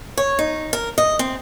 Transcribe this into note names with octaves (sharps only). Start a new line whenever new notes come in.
C#5
D#4
A#4
D#5
C4